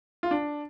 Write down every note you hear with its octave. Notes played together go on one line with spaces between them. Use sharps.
F4
D4